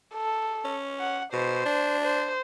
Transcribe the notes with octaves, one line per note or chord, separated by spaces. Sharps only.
A4
C#4
F#5
B2 C5
D4
C5